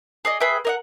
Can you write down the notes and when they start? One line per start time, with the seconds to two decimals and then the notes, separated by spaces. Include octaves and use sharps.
0.25 G#4 D5 D#5
0.40 G#4 B4 E5 G5
0.65 A#4 D#5 F#5